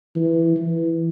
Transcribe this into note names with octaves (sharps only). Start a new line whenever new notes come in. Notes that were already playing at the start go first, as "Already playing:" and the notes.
E3
E3